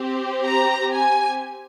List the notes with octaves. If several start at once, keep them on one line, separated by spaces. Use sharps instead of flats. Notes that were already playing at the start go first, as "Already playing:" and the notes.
Already playing: C4 G4
A#5
G#5